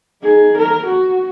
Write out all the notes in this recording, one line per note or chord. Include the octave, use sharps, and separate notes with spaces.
D#4 G#4
A#4
F#4